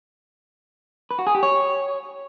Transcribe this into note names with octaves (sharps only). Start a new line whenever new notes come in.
B4
F#4
G#4
G4
C#5